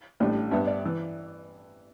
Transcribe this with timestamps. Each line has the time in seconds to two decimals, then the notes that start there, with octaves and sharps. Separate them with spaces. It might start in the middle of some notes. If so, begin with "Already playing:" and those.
0.20 A1 A2 G3 D4
0.51 G2 G3 B3 D4 E5
0.67 D5
0.85 E3